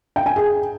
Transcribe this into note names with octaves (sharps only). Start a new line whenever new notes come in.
G5
G#5
G#4